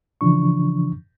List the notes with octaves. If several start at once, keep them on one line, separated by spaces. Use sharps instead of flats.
C#3 E3 F3 D4 C#6